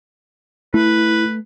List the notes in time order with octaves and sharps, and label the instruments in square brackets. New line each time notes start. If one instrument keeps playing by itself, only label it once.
[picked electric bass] A3 [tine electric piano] E4 [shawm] B4